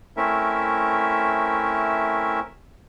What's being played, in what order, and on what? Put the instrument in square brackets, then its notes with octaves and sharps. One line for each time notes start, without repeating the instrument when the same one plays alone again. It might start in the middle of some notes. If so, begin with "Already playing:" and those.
[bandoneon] A3 C4 C#4 E4 A#4 E5